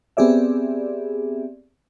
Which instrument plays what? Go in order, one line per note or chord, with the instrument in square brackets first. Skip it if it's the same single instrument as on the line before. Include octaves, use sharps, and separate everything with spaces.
[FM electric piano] B3 C4 G4 G#4 D5 E5